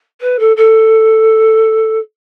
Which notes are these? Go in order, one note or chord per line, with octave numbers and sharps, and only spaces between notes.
B4
A4
A4